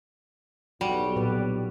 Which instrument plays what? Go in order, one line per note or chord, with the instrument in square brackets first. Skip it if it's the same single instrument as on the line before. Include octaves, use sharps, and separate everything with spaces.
[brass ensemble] B1 [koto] G3 [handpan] F#4
[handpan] A#2 B4 D5